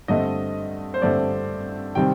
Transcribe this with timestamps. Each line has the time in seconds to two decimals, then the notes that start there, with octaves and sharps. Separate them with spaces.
0.08 G2 D3 A3 C4 D#5
0.94 C5
1.02 G2 D3 A3 C4 D5
1.95 C3 D#3 G3 C4 G5